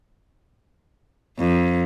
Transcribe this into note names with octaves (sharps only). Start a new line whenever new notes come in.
F2